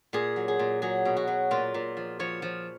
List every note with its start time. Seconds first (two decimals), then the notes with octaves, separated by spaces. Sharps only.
0.13 A#2 G#4
0.36 F#3
0.48 G#4
0.59 A#2
0.82 F#3 G#4
1.05 B2
1.17 F#4
1.27 F#3
1.51 A#2 F4
1.74 A#2
1.97 F3
2.19 F3 C#5
2.42 F3